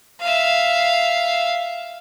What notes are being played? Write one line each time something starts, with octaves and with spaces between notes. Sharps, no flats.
E5 F5